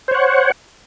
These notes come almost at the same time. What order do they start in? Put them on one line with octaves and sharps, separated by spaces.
C5 C#5 F#5